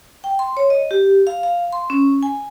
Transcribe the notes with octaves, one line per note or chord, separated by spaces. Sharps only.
G5
C6
C#5
D#5
G4
F5
F5
C6
C#4
G#5